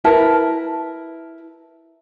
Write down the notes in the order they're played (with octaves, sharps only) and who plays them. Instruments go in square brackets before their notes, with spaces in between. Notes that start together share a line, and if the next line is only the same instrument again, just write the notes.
[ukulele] E4 A#4 B4 A5